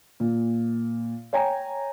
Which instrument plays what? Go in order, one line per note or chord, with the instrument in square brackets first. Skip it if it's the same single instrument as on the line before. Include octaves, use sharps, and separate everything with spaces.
[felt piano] A#2
C#5 G5 G#5 A#5